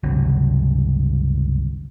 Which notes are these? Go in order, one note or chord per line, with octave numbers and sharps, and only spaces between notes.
G1 C#2 C3 F#3